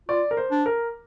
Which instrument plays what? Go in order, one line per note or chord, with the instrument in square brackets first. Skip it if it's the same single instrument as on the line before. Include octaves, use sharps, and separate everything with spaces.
[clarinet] F4 [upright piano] D5
[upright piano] A#4
C5
[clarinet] D4
[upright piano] A#4